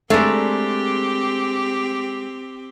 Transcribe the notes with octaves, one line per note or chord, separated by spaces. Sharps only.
G#3 A3 C4 D4 G4 A#4